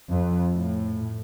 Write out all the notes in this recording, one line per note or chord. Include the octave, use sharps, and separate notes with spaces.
F2
A2